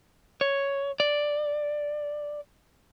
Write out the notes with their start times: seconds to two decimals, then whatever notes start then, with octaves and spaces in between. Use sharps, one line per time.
0.41 C#5
1.00 D5